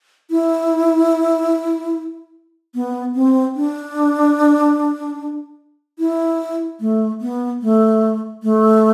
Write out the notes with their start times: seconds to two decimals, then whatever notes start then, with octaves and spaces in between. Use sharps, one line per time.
0.31 E4
2.75 B3
3.15 C4
3.56 D4
5.99 E4
6.80 A3
7.21 B3
7.62 A3
8.43 A3